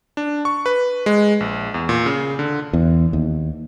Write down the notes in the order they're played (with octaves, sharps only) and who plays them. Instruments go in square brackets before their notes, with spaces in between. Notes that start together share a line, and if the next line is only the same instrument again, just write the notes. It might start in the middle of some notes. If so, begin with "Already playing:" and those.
[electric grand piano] D4
C#6
B4
G#3
A#1
E2
A#2
C#3
D3
[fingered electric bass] E2
D#2